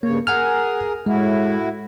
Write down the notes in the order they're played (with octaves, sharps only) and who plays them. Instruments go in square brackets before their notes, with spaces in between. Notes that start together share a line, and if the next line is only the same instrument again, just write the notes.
[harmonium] G2 C#3 C#5 [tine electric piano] A#3
[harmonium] G#4 A#4 [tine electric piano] F#5 G#5 F6
[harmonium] A2 E4 F#4 [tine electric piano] G#3